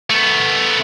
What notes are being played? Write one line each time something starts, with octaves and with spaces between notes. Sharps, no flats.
A3 B3